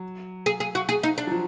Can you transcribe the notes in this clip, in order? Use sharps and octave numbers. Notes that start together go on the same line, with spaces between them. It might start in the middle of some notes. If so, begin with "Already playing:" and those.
Already playing: F#3
G#4
G#4
F#4
G#4
D#4
D4
F#3
F3